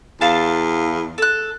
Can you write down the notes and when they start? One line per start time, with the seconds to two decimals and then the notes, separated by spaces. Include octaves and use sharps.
0.21 E2 F5 A5
1.18 A4 F#6